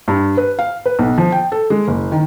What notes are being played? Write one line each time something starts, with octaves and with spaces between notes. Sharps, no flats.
G2
B4
F5
B4
B1
F3
G5
A4
G#3
F#1
D#3